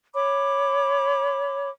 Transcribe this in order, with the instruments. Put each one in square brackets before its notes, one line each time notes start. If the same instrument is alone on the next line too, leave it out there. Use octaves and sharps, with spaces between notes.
[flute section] C#5 B5 D6